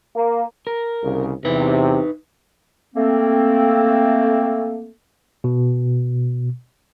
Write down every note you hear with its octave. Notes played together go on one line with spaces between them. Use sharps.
A#3
A#4
C2 C#3
E2 C3 D#4 B4
A3 A#3 C4
B2